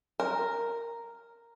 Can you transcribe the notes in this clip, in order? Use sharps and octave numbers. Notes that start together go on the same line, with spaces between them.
A#4